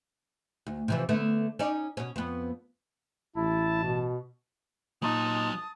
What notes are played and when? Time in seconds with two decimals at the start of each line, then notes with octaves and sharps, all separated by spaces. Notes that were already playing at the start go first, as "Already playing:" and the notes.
0.67 D2
0.88 C3 E3 F3
1.09 D3 A3 B3
1.59 C#4 D#4 D5
1.97 B2 C#4
2.16 F2 B3
3.36 A1 E4 A5
3.83 B2
5.02 A#2 F#3 D#4 D#5 A5 D#6